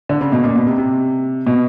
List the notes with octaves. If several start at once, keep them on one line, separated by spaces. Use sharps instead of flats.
D3
C#3
B2
A#2
B2
C3
C3
B2